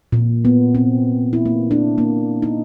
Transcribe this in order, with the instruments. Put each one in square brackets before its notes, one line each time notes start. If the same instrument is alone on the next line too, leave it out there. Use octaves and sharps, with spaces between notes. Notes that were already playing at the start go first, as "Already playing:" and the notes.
[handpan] A#2
B3
C4
E4
A#3
D4
A#3
D#4